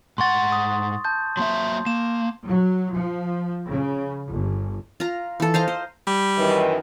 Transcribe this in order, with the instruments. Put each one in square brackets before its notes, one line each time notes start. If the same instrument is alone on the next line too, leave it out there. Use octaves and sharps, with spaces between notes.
[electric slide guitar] G#2 F#5 [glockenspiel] C6 C#6 A6
[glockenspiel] D#6
A5 G6
[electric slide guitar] F#3 A#3 E5 [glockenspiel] C6
[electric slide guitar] A#3 [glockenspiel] E7
[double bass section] F#3
F3
C#3
G1
[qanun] F4 A#5
E3 A4
C5 D#5 F5 A#5
C5
[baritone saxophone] G3
[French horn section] F#2 D#3 E3